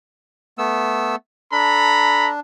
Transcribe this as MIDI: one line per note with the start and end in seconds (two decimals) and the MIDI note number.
0.58 1.16 57
0.58 1.16 59
0.58 1.16 88
1.52 2.40 62
1.52 2.31 69
1.52 2.31 82
1.52 2.31 83